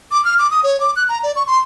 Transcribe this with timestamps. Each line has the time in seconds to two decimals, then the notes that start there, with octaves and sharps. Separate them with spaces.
0.11 D6
0.25 F6
0.39 D6
0.51 D#6
0.64 C#5
0.80 D6
0.96 F#6
1.09 A#5
1.23 D5
1.36 C#6
1.47 C6